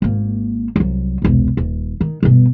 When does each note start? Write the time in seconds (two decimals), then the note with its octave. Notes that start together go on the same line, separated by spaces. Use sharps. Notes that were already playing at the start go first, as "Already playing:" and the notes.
0.02 G#1 A#3
0.76 C2 F#3
1.22 E1 C2
1.57 D#1
2.01 D#3
2.23 G1 B2